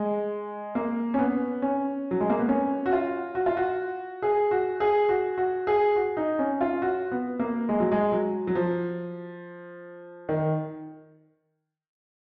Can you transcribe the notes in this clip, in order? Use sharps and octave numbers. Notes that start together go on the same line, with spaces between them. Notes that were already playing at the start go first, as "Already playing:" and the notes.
Already playing: G#3
A#3
C#4
B3
C#4
F#3
G#3
A#3
B3
C#4
F#4
F4
F#4
F4
F#4
G#4
F#4
G#4
F#4
F#4
G#4
F#4
D#4
C#4
F4
F#4
B3
A#3
G#3
F#3
G#3
F#3
F#3
F3
D#3